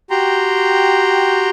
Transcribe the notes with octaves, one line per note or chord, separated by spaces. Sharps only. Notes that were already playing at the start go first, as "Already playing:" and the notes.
F#4 G4 G5 A#5 C6